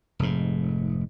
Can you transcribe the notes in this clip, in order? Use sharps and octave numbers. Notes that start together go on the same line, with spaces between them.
F1 G#2